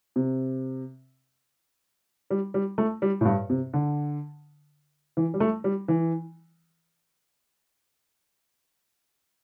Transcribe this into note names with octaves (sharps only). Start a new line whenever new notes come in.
C3
G3
G3
A3
G3
A2
G2
C3
D3
E3
G3
A3
G3
E3